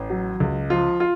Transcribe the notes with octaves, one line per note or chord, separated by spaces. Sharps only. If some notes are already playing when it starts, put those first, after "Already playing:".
Already playing: A1
F#3
C#2
F3 F4
F4